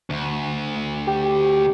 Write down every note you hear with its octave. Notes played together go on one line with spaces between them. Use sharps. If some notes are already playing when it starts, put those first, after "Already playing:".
D2
G4